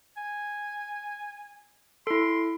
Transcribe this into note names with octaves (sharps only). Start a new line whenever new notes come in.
G#5
E4 A4 C6